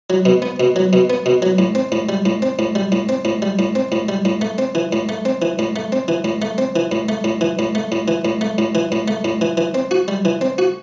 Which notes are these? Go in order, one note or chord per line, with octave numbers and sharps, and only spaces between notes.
F#3
B2
B3
B2
F#3
B2
B3
B2
F#3
A2
C4
A2
G3
A2
C4
A2
G3
A2
C4
A2
G3
A2
C4
A2
G3
A2
A3
C4
E3
A2
A3
C4
E3
A2
A3
C4
E3
A2
A3
C4
E3
A2
A3
A2
E3
A2
A3
A2
E3
A2
A3
A2
E3
A2
A3
A2
E3
E3
C4
F#4
G3
E3
C4
F#4